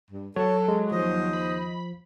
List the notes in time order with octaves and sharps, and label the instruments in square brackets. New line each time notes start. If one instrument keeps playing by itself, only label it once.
[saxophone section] G2
[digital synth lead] F#3 [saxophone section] A4 [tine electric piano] C#5
[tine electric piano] G#3
[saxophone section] D#2 C5 D#5 [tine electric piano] F3
[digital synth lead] B5